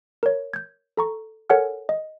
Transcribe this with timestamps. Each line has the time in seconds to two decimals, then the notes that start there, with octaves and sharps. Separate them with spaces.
0.23 A#4 C#5
0.53 G6 G#6
0.97 A4 A#5 C#6
1.50 A4 A#4 C#5 F#5 G#5 F6
1.89 D#5